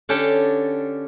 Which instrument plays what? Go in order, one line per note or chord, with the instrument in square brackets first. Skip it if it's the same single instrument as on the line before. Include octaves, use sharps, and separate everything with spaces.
[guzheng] D3 C#4 D4 G4 A4